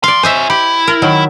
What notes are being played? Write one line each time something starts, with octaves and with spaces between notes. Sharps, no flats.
F3 D5 F5 C6
F#4 C5 D#5 E5 G#5
E4 G4
A#4
D#3 F#3